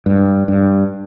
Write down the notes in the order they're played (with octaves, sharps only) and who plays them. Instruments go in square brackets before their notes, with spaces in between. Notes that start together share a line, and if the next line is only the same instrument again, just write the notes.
[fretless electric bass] G2
G2